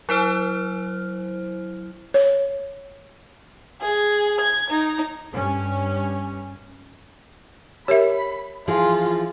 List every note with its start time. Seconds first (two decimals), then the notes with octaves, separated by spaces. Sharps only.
0.09 F#3 E4 C5 F6
2.14 C#5
3.80 G#4
4.41 G#6
4.70 D#4
5.33 G2 C#4
7.88 G4 A#4 C#5 E5 B5
8.68 E3 F3 F4 G#4